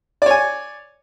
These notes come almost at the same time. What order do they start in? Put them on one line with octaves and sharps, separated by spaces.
D5 C#5 G#5